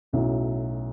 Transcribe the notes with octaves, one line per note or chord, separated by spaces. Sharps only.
B1 A2 F#3 C#4 E4